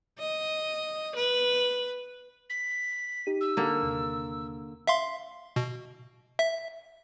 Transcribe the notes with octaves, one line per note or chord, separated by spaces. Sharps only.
D#5
B4
B6
D#4 G4 D#7
E6
D3 A#3
D#2 C3
E5 F5 C6
B2
E5